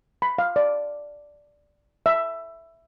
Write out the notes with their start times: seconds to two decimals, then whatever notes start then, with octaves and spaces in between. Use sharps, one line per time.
0.22 B5
0.38 F5
0.56 D5
2.06 E5